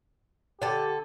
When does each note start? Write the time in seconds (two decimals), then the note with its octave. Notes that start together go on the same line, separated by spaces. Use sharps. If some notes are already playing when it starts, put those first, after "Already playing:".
0.62 D3 G4 A4